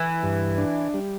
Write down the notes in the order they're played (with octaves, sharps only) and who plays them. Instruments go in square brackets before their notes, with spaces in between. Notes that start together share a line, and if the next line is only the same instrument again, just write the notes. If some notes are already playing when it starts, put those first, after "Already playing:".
Already playing: [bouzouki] E3
[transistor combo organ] G2
D4
G3